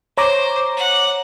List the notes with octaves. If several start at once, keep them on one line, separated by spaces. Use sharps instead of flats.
C5 C#5 A#5 D6
F#5